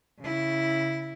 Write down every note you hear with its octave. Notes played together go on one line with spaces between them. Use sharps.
C#3 E4